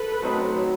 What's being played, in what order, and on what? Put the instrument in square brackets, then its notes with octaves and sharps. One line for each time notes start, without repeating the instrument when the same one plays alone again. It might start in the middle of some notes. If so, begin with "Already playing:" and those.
Already playing: [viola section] A4 B4
[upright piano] F#3 A3 C4 D#4
F#3